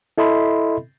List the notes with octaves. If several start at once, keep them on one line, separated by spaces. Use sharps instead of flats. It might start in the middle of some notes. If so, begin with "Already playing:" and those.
E4 A4 D#5 E5 B5 C6